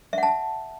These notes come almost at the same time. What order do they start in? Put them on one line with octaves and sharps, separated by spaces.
E5 F#5 A5